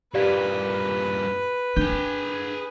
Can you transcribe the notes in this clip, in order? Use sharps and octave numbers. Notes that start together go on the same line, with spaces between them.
G2 A#2 G4 B4 D5 F5
D4 G#4 G5